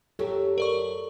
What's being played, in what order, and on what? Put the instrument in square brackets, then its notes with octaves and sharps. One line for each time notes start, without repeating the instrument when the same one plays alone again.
[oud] F#2 F#3 G4 [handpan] A4
[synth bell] A#4 D5 C#6